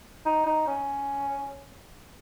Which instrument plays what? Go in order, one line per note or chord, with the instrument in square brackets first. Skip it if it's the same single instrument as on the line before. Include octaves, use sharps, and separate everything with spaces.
[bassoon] D#4
D#4
C#4